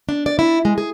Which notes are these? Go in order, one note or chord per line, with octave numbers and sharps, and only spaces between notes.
D4
D5
E4
G#3
G#4